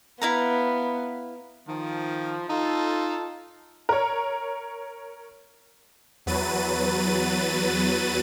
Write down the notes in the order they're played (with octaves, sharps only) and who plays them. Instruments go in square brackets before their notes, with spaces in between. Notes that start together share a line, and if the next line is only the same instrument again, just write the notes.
[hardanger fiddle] B3 [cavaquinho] E4 F5 A#5
[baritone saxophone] D#3 [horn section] F3
[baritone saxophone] D#4 [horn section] F4 A4
[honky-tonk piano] A#4 C#5
[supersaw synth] E2 F#3 B4 A6 D#7